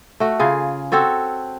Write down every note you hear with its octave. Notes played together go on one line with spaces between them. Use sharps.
A3 F#4
C#3 F4 G#4
C4 F#4 A4 C#5